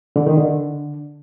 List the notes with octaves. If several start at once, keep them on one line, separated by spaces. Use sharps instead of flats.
D3
D#3
D3